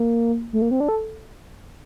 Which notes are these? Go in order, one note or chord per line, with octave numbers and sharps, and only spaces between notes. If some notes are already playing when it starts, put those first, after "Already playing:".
Already playing: A#3
A3
A#3
C4
D4
A4